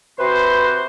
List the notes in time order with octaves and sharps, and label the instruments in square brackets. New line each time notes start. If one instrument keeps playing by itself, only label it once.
[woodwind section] C3 F#4 C6 [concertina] B4 [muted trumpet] C5